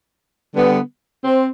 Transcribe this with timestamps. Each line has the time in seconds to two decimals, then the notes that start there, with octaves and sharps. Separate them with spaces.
0.54 D3 G3 B3
1.23 C4